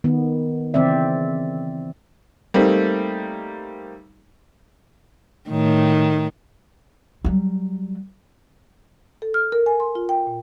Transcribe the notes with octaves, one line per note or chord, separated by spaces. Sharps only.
D#3 B3
C#3 E3 C4 D5 E5
G3 A3 A#3 C4 D#4
A2 D#3
F#3 G3
A4
F6
A#4
G#5
C6
F4
G5
A#2